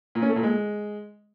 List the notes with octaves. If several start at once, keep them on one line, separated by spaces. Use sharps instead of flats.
A#2
C#4
A3
A#2
G#3